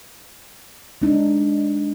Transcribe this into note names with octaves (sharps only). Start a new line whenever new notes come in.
G#3 D4 D#4